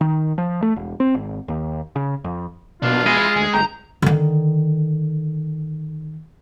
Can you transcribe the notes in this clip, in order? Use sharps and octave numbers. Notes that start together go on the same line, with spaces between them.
D#3
F3
A3
E1
C4
G#1
D#2
C#3
F2
B2 A#3 D4 F4
G#3 E4 G#4
D2 G#4
G1 G5 A#5
D3 D#3